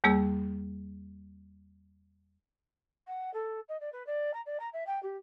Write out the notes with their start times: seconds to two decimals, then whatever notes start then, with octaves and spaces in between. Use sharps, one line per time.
0.04 E2 G3 A#3 G#4 E6
3.07 F#5
3.34 A4
3.68 D#5
3.80 D5
3.93 B4
4.07 D5
4.34 A#5
4.46 D5
4.60 A#5
4.73 E5
4.87 G5
5.03 G4